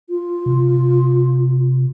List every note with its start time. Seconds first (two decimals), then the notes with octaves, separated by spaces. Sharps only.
0.09 F4
0.46 C3